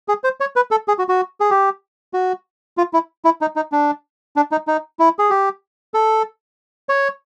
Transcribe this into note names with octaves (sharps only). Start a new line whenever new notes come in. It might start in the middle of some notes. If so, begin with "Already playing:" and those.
G#4
C5
C#5
B4
A4
G#4
F#4
F#4
G#4
G4
F#4
F4
E4
E4
D#4
D#4
D4
D4
D#4
D#4
E4
G#4
G4
A4
C#5